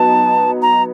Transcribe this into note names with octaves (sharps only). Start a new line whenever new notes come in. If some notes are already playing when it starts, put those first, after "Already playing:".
Already playing: F#3 B3 D#4 A5
A#5